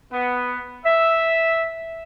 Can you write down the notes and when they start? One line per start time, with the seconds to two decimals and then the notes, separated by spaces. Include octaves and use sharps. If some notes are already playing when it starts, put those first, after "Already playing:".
0.12 B3
0.85 E5